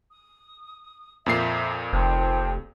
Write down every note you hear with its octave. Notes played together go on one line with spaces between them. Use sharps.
D#6
F2 A#2 E5 A#5 C7
F1 C5 G5 A5